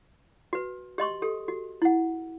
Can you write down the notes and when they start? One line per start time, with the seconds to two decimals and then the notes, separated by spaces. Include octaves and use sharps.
0.53 F#4 B4
0.98 G4 D#5 C6 C#6
1.22 G4 A4
1.48 F#4
1.82 E4 F#5